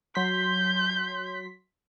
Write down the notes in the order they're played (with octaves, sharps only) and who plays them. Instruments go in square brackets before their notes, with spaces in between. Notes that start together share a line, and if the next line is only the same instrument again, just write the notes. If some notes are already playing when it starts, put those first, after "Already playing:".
[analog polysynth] F#3 C6 B6 [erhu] G6